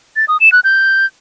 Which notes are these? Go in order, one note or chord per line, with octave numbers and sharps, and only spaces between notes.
A6
D#6
E7
F#6
G6